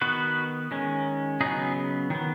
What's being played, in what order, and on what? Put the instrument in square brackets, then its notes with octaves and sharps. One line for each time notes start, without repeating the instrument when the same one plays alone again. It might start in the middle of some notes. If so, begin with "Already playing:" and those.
[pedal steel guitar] D#3 B3 F#4 B4
D#3 G#3 C#4
C#3 F#3 B3 D#4 G#4
D#3 B3